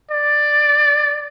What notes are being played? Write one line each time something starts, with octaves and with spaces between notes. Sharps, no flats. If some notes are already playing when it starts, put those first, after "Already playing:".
D5